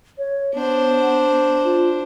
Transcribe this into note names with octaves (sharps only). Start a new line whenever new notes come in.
C#5
B3 D4 C5
F4